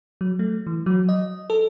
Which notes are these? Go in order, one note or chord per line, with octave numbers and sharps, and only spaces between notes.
F#3
A3
E3
F#3
D#5
A4